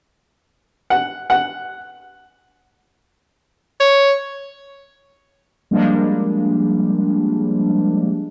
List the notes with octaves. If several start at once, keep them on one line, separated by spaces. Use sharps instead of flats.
F#5
F#5
C#5
F3 G3 G#3 A#3 D4